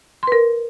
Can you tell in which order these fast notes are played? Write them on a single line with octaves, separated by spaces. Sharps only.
C6 B4 A#4